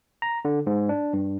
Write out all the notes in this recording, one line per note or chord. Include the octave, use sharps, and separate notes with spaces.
A#5
D3
G#2
D4
G2